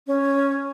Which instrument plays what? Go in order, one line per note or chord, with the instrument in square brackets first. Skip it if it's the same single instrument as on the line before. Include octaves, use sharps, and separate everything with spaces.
[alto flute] C#4